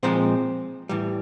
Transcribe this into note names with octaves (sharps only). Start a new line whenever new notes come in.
A#2 F3 G#3 C4 C5
A2 E3 G3